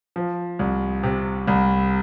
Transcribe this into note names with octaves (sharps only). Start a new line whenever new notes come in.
F3
C2
C3
C2